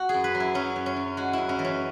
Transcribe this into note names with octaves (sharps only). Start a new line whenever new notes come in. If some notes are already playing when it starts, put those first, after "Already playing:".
Already playing: F#4
G#4
F#2
B4
F#3
E4
F#3 C#4
F#2
C#4
F#2
G#3 F#4
F#2 E4
C#4
E3
C#4